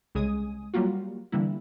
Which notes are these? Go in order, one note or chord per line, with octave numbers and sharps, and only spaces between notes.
C2 C#3 G#3 G#5 D#6
F#3 G3 A#3 F4 F#4
D3 E3 G3 A#3 E4